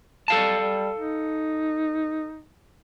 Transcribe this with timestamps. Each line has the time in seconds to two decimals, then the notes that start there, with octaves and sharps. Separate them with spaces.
0.28 G3 A4 F5 A5
0.60 G3
0.96 D#4